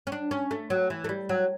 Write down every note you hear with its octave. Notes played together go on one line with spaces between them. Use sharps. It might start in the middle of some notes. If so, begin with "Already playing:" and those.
C#4
D4
C#4
A3
F#3
E3
A3
G3
F#3